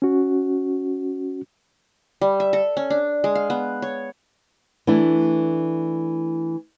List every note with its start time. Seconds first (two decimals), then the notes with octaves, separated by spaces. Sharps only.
0.02 C#4 F#4
2.21 G3
2.40 E5
2.53 A4
2.77 C#4
2.90 D4
3.24 G#3
3.35 F5
3.50 B3
3.82 C#5
4.87 E3 A3 D4 E4